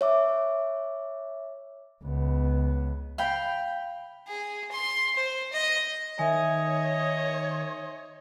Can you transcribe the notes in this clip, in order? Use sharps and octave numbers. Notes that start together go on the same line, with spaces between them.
C#5 E5 D6
C#2 B3
F5 G5 B5
G#4
C6
C5
D#5
D#3 C#5 D#5 E5 G#5